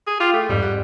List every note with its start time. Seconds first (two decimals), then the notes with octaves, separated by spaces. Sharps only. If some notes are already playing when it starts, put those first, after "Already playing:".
0.07 G#4
0.20 F4 G4 D6 A6
0.33 A3
0.49 F2 G#2 G3
0.62 F#5